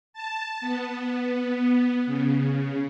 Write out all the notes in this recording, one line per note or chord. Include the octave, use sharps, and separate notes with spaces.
A5
B3
C#3